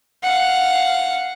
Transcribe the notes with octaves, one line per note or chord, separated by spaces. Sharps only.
F5 F#5